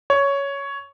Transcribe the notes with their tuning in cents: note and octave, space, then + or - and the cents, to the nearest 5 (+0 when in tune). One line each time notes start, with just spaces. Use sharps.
C#5 +10